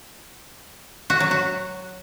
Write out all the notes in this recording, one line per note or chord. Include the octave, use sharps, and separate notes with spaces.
F#4
F#3
F#4